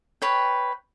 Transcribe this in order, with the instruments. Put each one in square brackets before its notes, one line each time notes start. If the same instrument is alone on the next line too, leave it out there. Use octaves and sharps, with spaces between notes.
[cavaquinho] B4 C#5 G5